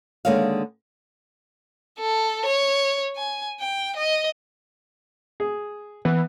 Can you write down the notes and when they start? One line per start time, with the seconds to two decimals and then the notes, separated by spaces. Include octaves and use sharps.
0.25 D3 D#3 G#3 A#3 C#5 F5
1.99 A4
2.45 C#5
3.16 G#5
3.60 G5
3.96 D#5
5.40 G#4
6.05 E3 B3